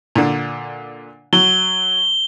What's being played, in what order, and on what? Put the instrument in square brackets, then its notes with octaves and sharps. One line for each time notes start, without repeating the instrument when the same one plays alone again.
[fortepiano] A#2 D3
[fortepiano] F#3 [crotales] G7